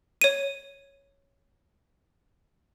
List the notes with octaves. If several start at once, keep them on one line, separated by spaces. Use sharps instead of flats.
C#5 D#7